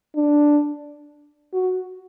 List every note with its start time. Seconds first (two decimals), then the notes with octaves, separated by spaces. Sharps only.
0.16 D4
1.54 F#4